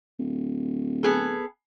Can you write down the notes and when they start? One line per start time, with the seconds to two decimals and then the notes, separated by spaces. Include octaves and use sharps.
0.19 D1
1.03 B3 G#4 A4